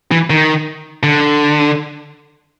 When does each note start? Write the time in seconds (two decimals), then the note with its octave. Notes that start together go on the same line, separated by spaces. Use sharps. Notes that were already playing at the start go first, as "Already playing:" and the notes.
0.11 E3
0.30 D#3
1.03 D3